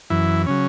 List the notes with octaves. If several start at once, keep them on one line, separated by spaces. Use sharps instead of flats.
F#2 E3 E4
C#3 F#3 C#4